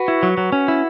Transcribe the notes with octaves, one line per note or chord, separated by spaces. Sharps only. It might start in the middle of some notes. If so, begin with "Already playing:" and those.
Already playing: F#4 B4
E4
F#3
F#3
C#4
E4